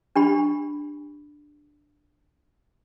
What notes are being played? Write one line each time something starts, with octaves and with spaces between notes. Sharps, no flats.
D4 G4 B5